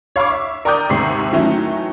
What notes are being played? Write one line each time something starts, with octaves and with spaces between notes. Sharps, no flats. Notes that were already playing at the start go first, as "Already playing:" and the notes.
C#5 F5 B5 C#6 D6
E5
A#4 D5 G5 D6 D#6 G6
D#2 G#2 C3 C7
D#3 E3 F#3 A3 C#4